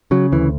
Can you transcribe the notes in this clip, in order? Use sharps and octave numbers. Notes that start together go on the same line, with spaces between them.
C#3 F#3
D2 E3